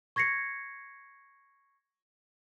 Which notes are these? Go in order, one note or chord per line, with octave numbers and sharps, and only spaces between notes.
C#6 G#6 A#6 C7 C#7